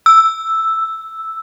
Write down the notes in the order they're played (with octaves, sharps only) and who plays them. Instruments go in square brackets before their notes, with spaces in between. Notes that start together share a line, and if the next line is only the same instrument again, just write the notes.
[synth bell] E6